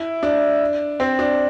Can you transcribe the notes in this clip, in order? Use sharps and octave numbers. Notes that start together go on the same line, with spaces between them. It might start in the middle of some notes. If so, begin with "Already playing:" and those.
Already playing: E4
D4
C4
D4